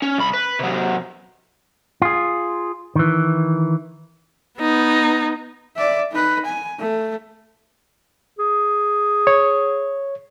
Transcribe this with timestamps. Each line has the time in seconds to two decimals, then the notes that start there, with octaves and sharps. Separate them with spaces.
0.02 C#4
0.18 C2 B5
0.33 B4
0.59 C3 F#3
2.02 F4 G#4
2.95 D#3 E3
4.60 B3 D#4
5.76 D5 E5
6.12 D#4 B4
6.46 G#5
6.79 A3
8.39 G#4
9.27 C#5